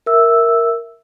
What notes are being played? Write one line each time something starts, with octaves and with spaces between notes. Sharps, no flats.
A#4 E5 E6